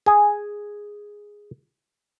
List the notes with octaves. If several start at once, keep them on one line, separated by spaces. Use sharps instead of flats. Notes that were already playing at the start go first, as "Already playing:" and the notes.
G#4 G#5